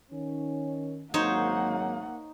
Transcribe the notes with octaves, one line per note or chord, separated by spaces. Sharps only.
D#3 C#4
G#1 F#3 A#3 D#4 C5 C#5 F#5